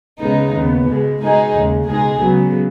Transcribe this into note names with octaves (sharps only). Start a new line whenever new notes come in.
C#2 C#3 G#3 B3 D#4
D#2 C#3 B3
C#2 B2 G#3
B2 G#3 D#4 G#4
D#2 C#3 G#3
C#2 B2 G#3 D#4 G#4
C#2 C#3 F#3 B3